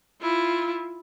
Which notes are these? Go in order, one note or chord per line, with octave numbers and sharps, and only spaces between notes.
E4 F4